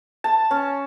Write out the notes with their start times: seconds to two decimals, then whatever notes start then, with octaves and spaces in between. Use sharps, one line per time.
0.24 A5
0.51 C#4